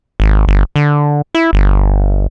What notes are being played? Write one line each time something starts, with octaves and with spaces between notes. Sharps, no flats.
G#1
G1
D3
E4
G1